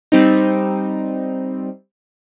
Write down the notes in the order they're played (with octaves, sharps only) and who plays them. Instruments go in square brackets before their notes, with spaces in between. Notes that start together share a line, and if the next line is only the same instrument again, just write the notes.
[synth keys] G3 C4 D#4